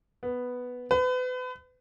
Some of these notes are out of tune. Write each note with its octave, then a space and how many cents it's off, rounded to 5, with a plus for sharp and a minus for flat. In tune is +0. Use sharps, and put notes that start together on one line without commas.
B3 +0
B4 +35